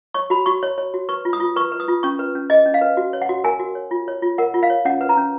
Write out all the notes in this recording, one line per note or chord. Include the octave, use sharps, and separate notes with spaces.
C#5 C#6
F#4 B5
F#4 C#6
C#5
C#5
F#4
B4 C#6
F4
D#6
F4
B4 C#6
B4
D#6
F4
C#4 C#6
B4
C#4
G#4 D#5
C#4
F5
B4
F#4
C#5
F#5
F#4
A#4 G#5
F#4
C#5
F4
C#5
F4
A#4 F#5
F4
F5
C#5
C#4 F#5
B4
A#5
C#4